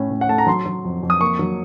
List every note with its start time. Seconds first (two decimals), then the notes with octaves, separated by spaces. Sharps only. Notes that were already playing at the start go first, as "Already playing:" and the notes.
Already playing: A2 C#4
0.10 A2
0.21 F#5
0.29 A3 A5
0.38 A#5
0.47 F#3 C6
0.66 F#3
0.85 F2
1.03 F2
1.10 D#6
1.21 A#3 C#6
1.39 F#3